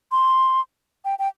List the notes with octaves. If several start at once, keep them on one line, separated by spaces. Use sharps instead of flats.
C6
G5
G5